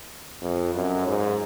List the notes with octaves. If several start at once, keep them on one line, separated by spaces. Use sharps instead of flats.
F2
F#2
G#2